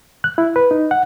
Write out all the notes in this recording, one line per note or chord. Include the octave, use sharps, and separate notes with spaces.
F#6
E4
B4
D#4
F#5